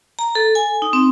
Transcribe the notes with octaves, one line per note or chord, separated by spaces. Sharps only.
A#5
A4
G#5
D#4
C4